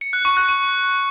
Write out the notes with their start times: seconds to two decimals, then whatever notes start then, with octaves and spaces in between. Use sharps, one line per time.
0.01 C#7
0.13 F#6
0.25 C#6
0.37 F#6
0.49 C#6